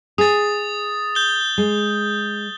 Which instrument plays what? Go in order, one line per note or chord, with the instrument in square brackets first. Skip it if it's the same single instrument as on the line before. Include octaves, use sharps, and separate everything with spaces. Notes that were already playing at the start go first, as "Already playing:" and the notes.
[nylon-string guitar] G#4 [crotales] D#6 A6
[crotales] G6 G7
[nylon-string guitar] G#3